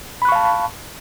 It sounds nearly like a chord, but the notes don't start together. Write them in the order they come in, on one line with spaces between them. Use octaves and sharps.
B5 F#6 C#6 F5 A5